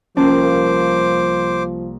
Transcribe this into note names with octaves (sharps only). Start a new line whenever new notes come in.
C2 F3 A#3 C#4 C5 D6